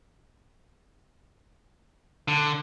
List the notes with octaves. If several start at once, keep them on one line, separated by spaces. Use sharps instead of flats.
D3